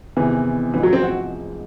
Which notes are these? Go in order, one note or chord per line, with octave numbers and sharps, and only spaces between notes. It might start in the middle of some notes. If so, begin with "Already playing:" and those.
E2 C3 D#3 E3
A1 G#2 E3 F3 G#3
F#3
C4
F#4